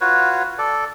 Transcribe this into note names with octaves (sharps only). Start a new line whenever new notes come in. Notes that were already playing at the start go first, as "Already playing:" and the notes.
F4 F#4 B4 C#5
A4 D5